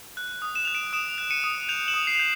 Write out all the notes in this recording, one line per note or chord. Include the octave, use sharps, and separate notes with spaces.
F#6
D#6
E7
F#6 F7
D7 E7
D#6 D7 E7
F#6
C#7 D#7
D#6
G6 D#7 F7
E7 F#7
D#6
C7
G6